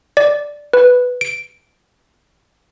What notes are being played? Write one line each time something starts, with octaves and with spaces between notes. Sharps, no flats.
D5
B4
D7